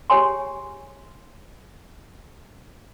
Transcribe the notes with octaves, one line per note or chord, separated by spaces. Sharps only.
G4 G#4 C#5 G#5 C6